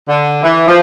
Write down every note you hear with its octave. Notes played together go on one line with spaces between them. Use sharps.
D3
E3
F3